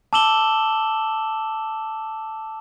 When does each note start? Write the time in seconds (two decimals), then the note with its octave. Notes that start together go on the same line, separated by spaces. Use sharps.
0.13 A5 D6 E6 E7 F#7 G7